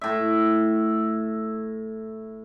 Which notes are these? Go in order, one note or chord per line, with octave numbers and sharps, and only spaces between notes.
A2 E5